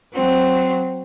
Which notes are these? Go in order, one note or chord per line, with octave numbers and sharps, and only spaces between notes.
F#3 C4